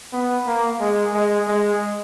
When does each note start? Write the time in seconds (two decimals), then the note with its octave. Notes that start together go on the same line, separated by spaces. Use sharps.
0.13 B3
0.47 A#3
0.80 G#3
1.14 G#3
1.48 G#3